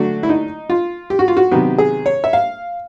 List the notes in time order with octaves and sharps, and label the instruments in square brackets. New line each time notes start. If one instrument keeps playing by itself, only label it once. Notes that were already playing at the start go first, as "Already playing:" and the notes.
Already playing: [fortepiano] D3 F#3 A3 D4 F#4
E4
D#4
F4
G4
F#4
F4
F#4
C3 D#3 F#3 B3 G4
G#4
C#5
E5
F5